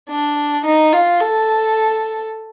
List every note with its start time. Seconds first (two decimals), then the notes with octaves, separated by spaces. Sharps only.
0.09 D4
0.65 D#4
0.93 F4
1.20 A4